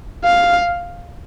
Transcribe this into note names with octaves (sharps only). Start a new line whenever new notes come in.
F5